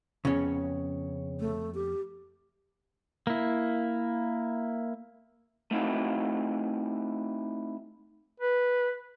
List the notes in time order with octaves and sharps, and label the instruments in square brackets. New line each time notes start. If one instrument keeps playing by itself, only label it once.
[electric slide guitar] F2 B3 C#5 [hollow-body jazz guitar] C#3 C#4
[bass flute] A3
G4
[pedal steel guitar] A#3 E4
[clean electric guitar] A3 C4 D#4 E4 F#4
[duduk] B4